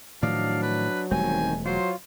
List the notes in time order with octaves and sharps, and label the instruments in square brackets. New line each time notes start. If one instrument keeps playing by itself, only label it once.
[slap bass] A2 D#3 F3 [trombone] F#3 [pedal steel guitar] D4 D5 D#5 [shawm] F5
[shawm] B4
[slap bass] E1 G3 A3 [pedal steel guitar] D#3 C4 [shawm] G#5
[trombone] F#3 [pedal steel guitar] F4 C#5 [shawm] C5